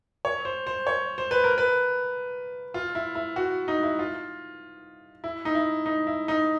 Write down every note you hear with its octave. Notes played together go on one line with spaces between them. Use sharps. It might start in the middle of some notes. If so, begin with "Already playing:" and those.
C#5
C5
C5
C#5
C5
B4
A#4
B4
F4
E4
E4
F#4
D#4
E4
F4
E4
D#4
E4
D#4
E4
D#4